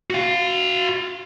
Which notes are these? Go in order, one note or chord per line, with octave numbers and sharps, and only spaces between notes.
F#4 F5